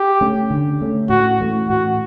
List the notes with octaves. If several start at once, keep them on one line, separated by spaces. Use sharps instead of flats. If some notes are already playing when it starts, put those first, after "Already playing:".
Already playing: G4
A3 C#4
D3
A3 C#4
A2 F#4
E3 A3 C#4
A2 F#4